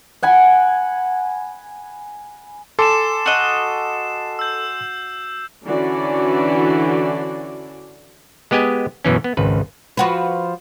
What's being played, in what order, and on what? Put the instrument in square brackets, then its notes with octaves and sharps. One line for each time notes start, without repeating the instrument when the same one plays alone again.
[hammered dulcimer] F#5 G#5 B5
[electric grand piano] A4 [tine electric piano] G#5 C6 D6 [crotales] C7 E7
[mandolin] F#4 D#5
[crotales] E6 G6
[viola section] D3 E3 C#4 D4 F#4 D5
[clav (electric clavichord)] G#3 B3 G4 D#5 G#5
F#2 B2 E3 C#4
B3
G#1 C#2 B4
[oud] F3 F#4 B4